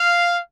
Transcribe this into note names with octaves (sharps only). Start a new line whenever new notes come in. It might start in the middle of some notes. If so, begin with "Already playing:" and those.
Already playing: F5